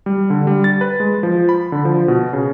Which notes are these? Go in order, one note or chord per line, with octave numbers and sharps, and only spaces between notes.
G3
D3
G3
A6
B4
G#3
F3
B5
D3
F3
B2
C#3